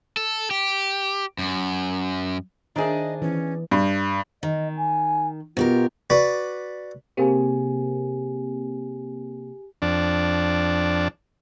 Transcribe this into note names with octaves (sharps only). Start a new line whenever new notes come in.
A4
G4
F#2
D#3 D4 G#4 C5 D#5 E5
E3 C#4
G2
D#3 D#5
G#5
B2 F4 G4 A#4
F#4 B4 D5 B5
C3 A#3 C4 G4 G#4 G#5
F2 D4